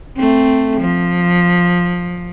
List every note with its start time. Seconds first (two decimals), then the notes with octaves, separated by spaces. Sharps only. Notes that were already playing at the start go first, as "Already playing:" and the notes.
0.17 A3 C4
0.80 F3